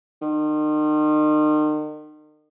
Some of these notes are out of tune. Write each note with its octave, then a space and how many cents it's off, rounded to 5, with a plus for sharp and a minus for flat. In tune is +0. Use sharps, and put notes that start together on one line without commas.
D#3 -40